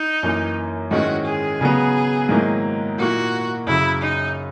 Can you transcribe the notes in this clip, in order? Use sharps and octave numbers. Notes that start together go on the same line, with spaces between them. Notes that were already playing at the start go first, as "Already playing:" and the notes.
Already playing: D#4
F#2 E3 A#3
G#2 D#3 G#3 C#4 E4 F#4
G#4
C#3 F#3 B3
G#2 D#3 F#3 A#3 E4
A#2 A#3 E4 F#4
F#2 C#3 F#3 E4
D#4